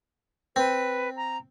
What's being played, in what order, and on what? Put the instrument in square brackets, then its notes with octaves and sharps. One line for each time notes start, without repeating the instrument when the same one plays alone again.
[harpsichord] C4 [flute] B4
[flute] A#5